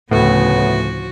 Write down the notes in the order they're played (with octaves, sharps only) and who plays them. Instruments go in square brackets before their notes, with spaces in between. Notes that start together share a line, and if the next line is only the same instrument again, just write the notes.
[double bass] D2 C#3 [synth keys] A2 [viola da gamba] F3 F#4 [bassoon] B3